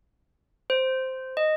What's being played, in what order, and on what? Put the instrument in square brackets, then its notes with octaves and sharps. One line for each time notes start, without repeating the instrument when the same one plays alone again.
[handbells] C5
D#5